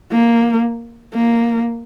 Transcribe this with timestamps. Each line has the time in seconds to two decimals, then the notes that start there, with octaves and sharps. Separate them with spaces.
0.11 A#3
1.14 A#3